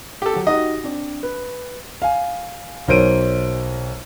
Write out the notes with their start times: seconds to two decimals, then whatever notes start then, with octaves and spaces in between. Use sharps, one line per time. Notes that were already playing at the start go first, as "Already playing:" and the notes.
0.22 G4 A4
0.34 F#3 F#4
0.47 D#4 F#4 G4 D#5
0.84 C4 D4
1.23 B4
2.02 F5 G#5
2.88 B1 A#4 C5 C#5 D7 D#7